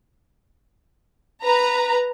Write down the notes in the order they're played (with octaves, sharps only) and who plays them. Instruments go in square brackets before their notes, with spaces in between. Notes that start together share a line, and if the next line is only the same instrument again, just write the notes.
[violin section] B4 A#5